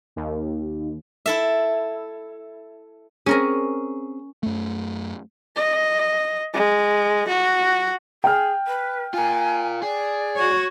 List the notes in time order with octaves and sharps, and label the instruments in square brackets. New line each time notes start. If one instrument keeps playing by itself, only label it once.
[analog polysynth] D#2
[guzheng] E4 A4 E5
[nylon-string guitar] C4 G#4 [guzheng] C#4 A#4 A#5
[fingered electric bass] F#2 A3
[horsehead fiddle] D#5
G#3
F#4
[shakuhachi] G#4 [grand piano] G5 F6
[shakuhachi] B4
[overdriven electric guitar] F4 A#4 [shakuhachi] G#5
[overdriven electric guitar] G#4 [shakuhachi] D5
[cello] F#4 C#5